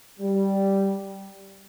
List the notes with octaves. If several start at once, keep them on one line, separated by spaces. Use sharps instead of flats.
G3